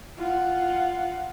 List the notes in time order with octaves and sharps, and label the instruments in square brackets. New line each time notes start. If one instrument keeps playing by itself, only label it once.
[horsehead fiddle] F4 F#5